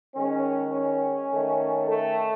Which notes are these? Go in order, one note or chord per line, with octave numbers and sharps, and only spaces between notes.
D#3 G#3 C#4
C#4
D#3 A3
A3